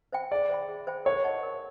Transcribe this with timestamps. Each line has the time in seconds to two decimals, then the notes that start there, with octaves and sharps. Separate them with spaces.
0.12 C5 E5 G5 B5
0.31 G#4 D5
0.50 C5 E5 G5 B5
0.69 G#4
0.87 C5 E5 G5 B5
1.05 A#4 C#5
1.24 D#5 F#5 A5 C#6
1.43 A#4